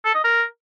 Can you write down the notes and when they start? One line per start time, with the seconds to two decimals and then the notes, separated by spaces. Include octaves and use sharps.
0.05 A4
0.14 D#5
0.24 A#4